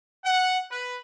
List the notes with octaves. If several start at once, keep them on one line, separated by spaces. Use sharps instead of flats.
F#5
B4